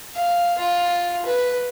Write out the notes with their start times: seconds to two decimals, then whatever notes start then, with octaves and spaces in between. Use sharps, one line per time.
0.15 F5
0.59 F4
1.26 B4